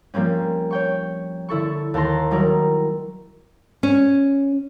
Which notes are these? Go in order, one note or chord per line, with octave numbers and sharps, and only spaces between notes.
F3 G3 A#3 C4 C#4
C#5 G5 C#6
D3 E4 A4 C#6
D#2 A5 A#5 C6 A#6
D#3 F#3 G3 D#4 E4 A#4
C#4